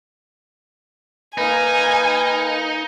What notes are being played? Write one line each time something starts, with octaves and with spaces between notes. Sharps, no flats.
A#3 D#4 B4 G#5